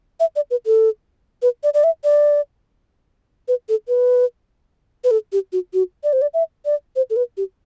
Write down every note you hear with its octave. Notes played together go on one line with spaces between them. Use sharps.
E5
D5
B4
A4
B4
D5
D5
E5
D5
B4
A4
B4
B4
A4
G4
F#4
F#4
D5
C5
D5
E5
D5
C5
A4
B4
G4